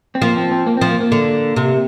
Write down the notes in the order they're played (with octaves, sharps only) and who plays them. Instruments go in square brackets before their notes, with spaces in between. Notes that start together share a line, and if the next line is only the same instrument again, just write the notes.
[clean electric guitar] C4
[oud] F3 [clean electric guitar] A#3
[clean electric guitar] C4
C4
A#3
C4
[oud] F3
[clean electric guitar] A#3
A#3
[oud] D3
C3